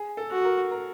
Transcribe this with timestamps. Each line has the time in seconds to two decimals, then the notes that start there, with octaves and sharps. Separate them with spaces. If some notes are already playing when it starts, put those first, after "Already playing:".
Already playing: G#4
0.17 A4
0.31 F#4
0.45 A#4
0.71 A#4